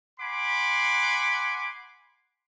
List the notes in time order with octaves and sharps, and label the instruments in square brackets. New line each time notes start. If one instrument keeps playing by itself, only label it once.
[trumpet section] F#5 G#5 B5 C6 D6